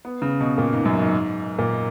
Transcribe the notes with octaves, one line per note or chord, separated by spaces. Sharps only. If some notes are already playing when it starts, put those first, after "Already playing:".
B3
C#3
B2
A#2
G#2
F#2
G#2
A#2